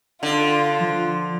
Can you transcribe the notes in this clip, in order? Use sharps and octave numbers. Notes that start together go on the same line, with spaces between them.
D3 F4
F3